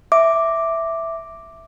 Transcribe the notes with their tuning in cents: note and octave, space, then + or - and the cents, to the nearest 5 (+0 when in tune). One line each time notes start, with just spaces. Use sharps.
E5 +0 D6 +0